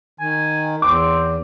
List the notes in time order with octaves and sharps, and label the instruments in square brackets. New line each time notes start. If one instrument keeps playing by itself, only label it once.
[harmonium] D#3 [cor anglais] G#5
[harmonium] E2 [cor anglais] C4 [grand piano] D6